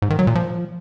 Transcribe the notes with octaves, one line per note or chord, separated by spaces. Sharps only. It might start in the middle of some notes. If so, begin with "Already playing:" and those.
G#2
D#3
F#3
A#2
F3